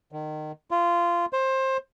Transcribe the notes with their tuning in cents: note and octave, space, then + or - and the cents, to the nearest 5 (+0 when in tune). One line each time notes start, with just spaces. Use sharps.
D#3 -25
F4 -15
C5 +20